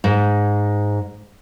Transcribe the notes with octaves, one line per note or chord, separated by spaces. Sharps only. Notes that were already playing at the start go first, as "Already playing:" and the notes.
G#2